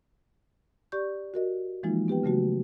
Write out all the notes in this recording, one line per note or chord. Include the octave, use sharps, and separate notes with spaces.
G4 D5 C#6 G6
F#4 A#4 D#5
E3 F3 G#3 A#3 D#4 F4
B3 G4 B4 G5
C#3 F#3 A3 F#4